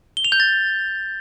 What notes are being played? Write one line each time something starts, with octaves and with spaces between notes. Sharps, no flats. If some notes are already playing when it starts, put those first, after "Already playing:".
G7
F7
G6
A6